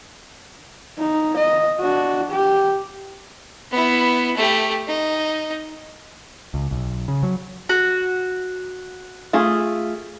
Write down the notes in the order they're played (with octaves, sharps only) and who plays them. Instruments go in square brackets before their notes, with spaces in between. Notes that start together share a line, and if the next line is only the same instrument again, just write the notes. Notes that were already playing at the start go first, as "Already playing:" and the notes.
[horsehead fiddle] D#4
D#5
D4 F#4
G4
[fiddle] B3 E4
A3 G4
D#4
[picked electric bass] C#2
B1
C#3
F#3
[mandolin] F#4
[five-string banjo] A3 F4 G#4